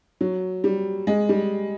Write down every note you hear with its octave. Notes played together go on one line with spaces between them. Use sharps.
F#3
G3
G#3
G3